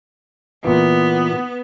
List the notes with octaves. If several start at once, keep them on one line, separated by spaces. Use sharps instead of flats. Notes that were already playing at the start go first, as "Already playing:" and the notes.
A#2 E3 B3